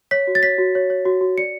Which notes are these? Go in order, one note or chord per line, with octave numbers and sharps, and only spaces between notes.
C#5 B6
F#4
A6
C#5 B6
F#4
C#5
C#5
F#4
F#4
D5 C#7